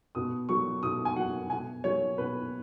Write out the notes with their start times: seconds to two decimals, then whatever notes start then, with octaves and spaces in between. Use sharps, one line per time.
0.15 B2 D#6
0.49 F#3 C#6
0.83 B2 D#6
1.05 G#5
1.16 F#3 F#5
1.50 B2 G#5
1.84 F#3 C#5
2.18 B2 B4